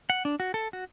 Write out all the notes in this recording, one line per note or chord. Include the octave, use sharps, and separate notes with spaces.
F#5
D4
F#4
A4
F#4